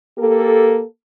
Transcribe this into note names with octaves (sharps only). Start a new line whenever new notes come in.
A#3 G4 A4